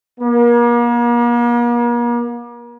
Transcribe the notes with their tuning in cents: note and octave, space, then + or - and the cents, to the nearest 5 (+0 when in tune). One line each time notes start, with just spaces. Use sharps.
A#3 +40